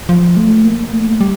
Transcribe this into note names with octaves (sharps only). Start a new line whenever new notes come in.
F3
A3
A#3
A3
G3